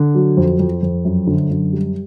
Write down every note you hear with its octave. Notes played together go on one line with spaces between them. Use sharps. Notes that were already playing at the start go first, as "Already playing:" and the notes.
Already playing: D3
F#3
F2
F2
F2
F#2
D3
F#2
G3